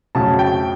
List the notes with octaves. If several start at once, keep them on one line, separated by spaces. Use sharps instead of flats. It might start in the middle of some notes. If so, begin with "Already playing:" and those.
F2 C#3 F#3 A3 A5
G5